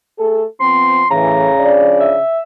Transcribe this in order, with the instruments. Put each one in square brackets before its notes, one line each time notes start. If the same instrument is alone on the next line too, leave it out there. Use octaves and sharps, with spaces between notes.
[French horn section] A3 G#4 A4
[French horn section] F3 B3 C4 [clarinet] C6
[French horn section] A2 E3 [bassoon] C#3 [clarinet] A#5
[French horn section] F3 D4 D5
[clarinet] E5